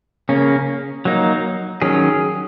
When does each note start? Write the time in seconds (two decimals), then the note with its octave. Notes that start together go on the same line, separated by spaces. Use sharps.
0.29 C#3 A#3 C#4
1.05 F#3 A#3 D#4
1.82 D#3 F#3 C#4 G#4